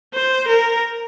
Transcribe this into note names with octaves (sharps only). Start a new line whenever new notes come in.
C5
A#4